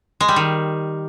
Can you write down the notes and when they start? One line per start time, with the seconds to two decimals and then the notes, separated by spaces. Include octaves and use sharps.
0.21 G#3
0.28 G3
0.36 D#3